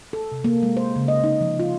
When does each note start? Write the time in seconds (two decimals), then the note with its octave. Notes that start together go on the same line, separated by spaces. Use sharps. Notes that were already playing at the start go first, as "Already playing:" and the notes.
0.13 A4
0.32 C3
0.44 A#3
0.63 G#3
0.77 C5
0.96 C#3
1.08 D#5
1.24 D#4
1.41 F3
1.60 F4